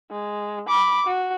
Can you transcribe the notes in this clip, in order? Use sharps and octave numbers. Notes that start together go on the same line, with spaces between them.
G#3
B5 D6
F#4